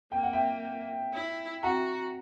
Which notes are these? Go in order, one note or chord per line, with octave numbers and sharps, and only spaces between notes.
A#3 G5
F#5
E5 G5
E4
F#4 F#5 A#5